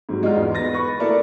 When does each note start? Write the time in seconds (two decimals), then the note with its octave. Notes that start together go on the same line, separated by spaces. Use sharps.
0.09 G#2 F#3 G3
0.23 G#3 D4 D#4 F4 F#4
0.36 E2 G#2
0.54 B3 A6 A#6
0.73 B4 C#6
1.00 A3 E4 A4 A#4 D5 E5